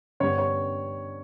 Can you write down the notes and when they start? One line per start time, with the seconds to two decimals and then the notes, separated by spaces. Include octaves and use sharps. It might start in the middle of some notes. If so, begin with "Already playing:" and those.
0.20 G2 D3 G3 B3 C#5
0.38 C#5